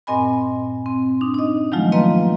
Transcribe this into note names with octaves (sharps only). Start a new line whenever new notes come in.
G2 A#2 C4 D#5 G#5 B5
C4
D4 D#4
D#4 D#5
D#3 F3 F#3 G#3 A3 F4
A#3 B4 D#5 F5 A#5 C6